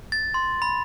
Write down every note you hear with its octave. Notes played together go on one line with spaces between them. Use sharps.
A6
C6
B5